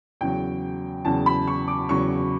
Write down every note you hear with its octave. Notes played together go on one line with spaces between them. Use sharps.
E2 C#3 F#3 G5
E2 C#3 F#3 A5
B5
C#6
D6
E2 C#3 F#3 C#6